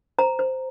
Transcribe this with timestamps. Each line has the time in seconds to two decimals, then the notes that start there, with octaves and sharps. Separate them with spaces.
0.19 C5 A#5
0.39 C5